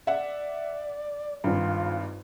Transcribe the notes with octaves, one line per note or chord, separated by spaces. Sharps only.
D5 E5 F#5
G#1 G2 F4